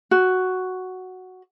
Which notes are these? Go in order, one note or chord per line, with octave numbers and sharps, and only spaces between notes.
F#4